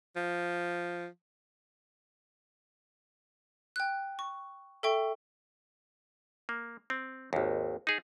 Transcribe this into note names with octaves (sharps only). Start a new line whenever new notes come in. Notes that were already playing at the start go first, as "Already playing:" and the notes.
F3
G5 F#6
C#6
A4 E5 G5 C#6
A#3
C4
G#1 D#2
D#4 G#4